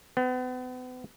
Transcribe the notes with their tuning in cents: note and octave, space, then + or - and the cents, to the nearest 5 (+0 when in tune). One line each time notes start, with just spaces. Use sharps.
B3 +40